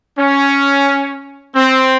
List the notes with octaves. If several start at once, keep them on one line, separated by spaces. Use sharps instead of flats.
C#4
C4